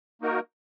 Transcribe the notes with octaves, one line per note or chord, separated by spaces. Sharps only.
A#3 D#4 F#4 A#4